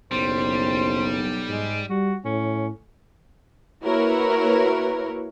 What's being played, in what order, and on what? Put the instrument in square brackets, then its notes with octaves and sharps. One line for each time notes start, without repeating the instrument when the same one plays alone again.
[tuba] F#1 [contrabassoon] B1 [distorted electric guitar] G3 [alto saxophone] C5
[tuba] G#2 [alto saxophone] G#3
[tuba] G3 [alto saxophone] F#4
[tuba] A2 [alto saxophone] C#4
[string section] A#3 E4 F#4 A#4 B4 C#5